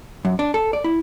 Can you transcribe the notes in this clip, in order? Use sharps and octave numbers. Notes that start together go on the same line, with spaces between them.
F#2
D4
A4
D5
E4